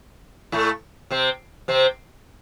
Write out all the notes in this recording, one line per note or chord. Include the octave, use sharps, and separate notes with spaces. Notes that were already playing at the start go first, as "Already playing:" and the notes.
A2 A3
C3 C4
C3 C4